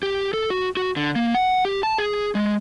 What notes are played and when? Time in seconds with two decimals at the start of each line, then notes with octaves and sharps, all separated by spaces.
0.03 G4
0.33 A4
0.50 F#4
0.77 F#4
0.96 D3
1.16 A#3
1.34 F#5
1.65 G4
1.83 A5
1.98 G#4
2.35 G#3